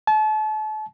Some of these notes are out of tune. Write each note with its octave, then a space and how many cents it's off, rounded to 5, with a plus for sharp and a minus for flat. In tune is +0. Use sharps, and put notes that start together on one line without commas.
A5 -35